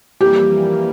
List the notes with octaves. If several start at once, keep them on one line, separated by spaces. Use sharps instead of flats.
F2 E3 G3 A#3 G4